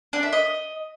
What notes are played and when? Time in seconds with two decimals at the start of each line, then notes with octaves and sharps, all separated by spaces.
0.13 D4
0.23 E5
0.33 D#5